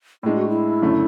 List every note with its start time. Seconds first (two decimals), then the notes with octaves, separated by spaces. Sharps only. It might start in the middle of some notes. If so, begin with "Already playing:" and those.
0.23 A2 G#3 D4 E4
0.37 F#4
0.49 E4
0.82 F#1 F#2 D3 A3